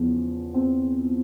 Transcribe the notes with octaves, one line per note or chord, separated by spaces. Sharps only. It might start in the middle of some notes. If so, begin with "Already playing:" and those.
Already playing: E2 C#3 F3
C4